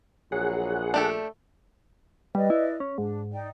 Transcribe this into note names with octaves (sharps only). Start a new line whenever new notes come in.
A#1 F#3 G#4 F#5
A3 D4 G4 A4
G3 B4 D5 D#5
E4
C#4
G#2 D4
D#4 D5 G5